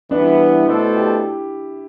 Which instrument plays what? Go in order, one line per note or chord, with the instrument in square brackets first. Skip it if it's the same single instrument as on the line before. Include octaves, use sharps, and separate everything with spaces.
[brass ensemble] E3 G3 B3 [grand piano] D4
[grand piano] E4
[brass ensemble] B2 A3 D4 A4 C5
[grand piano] G4